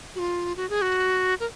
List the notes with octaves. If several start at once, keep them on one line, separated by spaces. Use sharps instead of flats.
F#4
F4
F#4
G#4
F#4
A#4